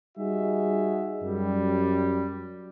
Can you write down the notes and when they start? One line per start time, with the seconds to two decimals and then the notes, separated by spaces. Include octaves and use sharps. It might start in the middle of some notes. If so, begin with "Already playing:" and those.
0.18 G3 D#4 F#4 G#4 E5
1.21 F#2 G3